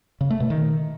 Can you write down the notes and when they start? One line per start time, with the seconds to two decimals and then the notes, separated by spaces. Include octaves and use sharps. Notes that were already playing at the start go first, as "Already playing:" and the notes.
0.21 C#3
0.30 A3
0.40 B2
0.50 D#3